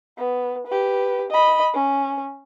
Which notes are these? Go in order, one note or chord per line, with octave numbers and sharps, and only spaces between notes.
B3
G4 B4
D#5 B5
C#4